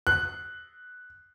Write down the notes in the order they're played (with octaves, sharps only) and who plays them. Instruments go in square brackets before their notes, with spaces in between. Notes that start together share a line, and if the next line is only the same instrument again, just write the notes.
[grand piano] F#6